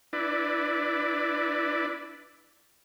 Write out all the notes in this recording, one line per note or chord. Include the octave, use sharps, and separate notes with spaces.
D4 E4 B4 D5